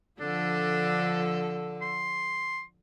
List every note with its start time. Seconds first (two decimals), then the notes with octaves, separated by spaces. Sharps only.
0.20 D3 F3 D4 A4
1.82 C6